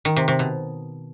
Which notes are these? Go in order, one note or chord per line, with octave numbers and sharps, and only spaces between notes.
D#3
C3
C3
B2